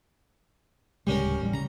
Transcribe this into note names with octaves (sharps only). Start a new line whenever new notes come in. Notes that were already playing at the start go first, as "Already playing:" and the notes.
D1 C#3 G3 G#3 C#4 A#4
A1 G3
C#3 A#5